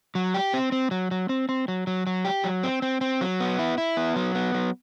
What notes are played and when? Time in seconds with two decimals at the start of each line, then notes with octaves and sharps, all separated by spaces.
0.15 F#3
0.34 G4
0.54 C4
0.72 C4
0.91 F#3
1.11 F#3
1.29 C4
1.49 C4
1.68 F#3
1.87 F#3
2.07 F#3
2.25 G4
2.44 F#3
2.63 C4
2.82 C4
3.01 C4
3.21 F#3
3.40 B3
3.59 E4
3.78 E4
3.97 B3
4.16 F#3
4.35 B3
4.54 F#3